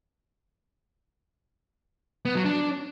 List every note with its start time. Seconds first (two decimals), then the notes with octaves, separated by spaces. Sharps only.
2.25 B3
2.35 F#3
2.45 D4